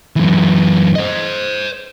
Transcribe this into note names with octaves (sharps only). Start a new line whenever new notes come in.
F#2 E3
C5 D#5